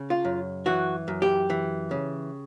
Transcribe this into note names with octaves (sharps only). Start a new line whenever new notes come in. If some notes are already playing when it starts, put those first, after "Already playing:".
Already playing: C#3
F4
F#2
E3 F#4
F#2
G4
E3
C#3